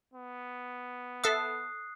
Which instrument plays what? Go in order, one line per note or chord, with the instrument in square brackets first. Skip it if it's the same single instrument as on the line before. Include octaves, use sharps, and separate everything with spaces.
[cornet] B3
[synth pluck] A4 E5 E6 [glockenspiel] D#6 F#6 C7